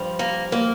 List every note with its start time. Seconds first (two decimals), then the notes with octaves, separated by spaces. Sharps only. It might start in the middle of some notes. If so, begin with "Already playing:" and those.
Already playing: G2 F3
0.19 A#3
0.52 A#3